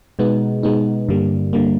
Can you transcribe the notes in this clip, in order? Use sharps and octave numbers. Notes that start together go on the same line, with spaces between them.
B2 G#3 B3 D#4
B2 G#3 B3 D#4
G2 D3 G3 A#3
D3 G3 A#3